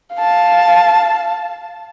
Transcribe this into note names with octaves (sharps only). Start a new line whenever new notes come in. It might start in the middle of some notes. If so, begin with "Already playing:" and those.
F5 A5